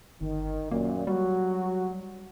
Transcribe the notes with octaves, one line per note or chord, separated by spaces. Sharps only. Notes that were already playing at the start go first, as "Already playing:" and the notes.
G1 D#3
F#2 A#2 A#3
F#3 G3 F#4